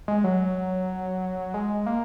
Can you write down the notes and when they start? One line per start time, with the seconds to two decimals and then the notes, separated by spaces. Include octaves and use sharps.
0.08 G#3
0.24 F#3
1.54 G#3
1.86 A#3